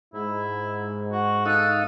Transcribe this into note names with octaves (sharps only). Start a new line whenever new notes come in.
G#2 E4
F#4
D#4 A4 F5 D#6 F#6